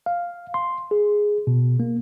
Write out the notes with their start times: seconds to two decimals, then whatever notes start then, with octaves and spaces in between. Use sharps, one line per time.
0.06 F5
0.54 C6
0.91 G#4
1.47 B2
1.80 A#3